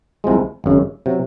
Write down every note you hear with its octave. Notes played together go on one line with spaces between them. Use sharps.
C2 C3 F3 G#3
G#1 F#2 C#3
C3 F#3